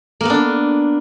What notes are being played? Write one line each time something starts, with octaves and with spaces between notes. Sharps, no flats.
A#3 B3 D4